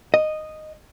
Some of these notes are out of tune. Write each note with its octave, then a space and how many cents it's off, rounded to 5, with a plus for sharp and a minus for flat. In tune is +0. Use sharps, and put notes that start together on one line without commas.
D#5 -10